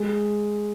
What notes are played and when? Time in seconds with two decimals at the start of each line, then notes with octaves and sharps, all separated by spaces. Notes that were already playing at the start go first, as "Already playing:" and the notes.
Already playing: G#3